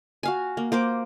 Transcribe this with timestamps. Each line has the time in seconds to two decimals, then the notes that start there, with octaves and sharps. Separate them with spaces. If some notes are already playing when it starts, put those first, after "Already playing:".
0.23 F#4 F5 G#5
0.57 A#3
0.72 A#3 C5 D6